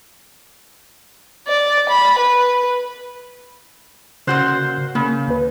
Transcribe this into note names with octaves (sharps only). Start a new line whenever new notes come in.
D5
B5
B4
A#2 C#3 F#4 C5 F#6 G6
C#3 A#3
D2 B4